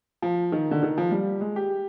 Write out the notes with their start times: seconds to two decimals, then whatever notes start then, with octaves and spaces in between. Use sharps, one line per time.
0.22 F3
0.52 D#3
0.71 D3
0.83 D#3
0.98 F3
1.11 G3
1.41 G#3
1.56 G4